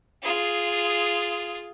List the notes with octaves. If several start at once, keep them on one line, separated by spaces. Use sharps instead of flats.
F4 G#4